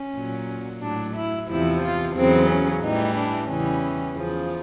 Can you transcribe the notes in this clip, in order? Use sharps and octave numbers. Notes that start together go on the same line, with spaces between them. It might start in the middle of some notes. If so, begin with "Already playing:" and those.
Already playing: C#4
A#2 F#3
A2 F#3 D4
E4
E2 C3 F3 E4
F4
E2 C#3 F#3 C4
C#4
A2 E3 G3 D#4
D4
E2 C#3 E3 G3 C#4
E2 C#3 F3